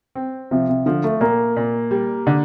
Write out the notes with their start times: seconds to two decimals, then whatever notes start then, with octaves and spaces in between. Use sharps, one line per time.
0.16 C4
0.51 C3 F3
0.69 C3
0.86 D3 F3
1.04 A3
1.21 A#2 A#3
1.56 A#2
1.91 G3
2.27 D3